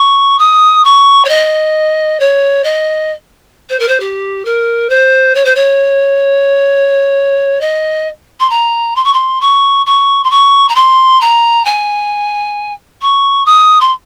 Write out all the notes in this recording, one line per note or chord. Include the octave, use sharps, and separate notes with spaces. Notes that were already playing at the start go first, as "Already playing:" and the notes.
Already playing: C#6
D#6
C#6
C#5
D#5
C#5
D#5
C5
A#4
C5
G4
A#4
C5
C#5
C5
C#5
D#5
C6
A#5
C6
C#6
C6
C#6
C#6
C6
C#6
A#5
C6
A#5
G#5
C#6
D#6
C6